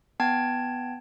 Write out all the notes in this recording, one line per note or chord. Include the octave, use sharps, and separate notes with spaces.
B3 G5 A5 G#6